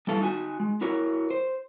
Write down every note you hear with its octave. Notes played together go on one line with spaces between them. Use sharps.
G3 B3 E4 A4 F5
D#4 F#4 G#5
G#3
E4 F#4 A#4 C#5
C5